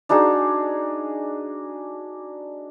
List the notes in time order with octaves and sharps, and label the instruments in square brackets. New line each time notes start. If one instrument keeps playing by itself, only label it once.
[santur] D4 D#4 F#4 G#4